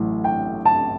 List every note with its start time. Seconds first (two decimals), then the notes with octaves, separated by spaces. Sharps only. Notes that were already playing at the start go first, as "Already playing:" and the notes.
Already playing: A1 A2 F#3
0.24 G5
0.65 A5